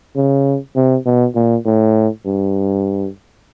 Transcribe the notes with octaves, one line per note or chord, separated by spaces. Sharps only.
C#3
C3
B2
A#2
A2
G2